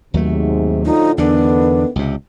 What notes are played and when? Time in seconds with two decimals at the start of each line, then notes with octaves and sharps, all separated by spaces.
0.14 D#2 G#2 C3 F#3 A3
0.85 A2 D3 F3 D#4
1.18 E2 D3 D#3 A3 B3 D4
1.96 C#2 C3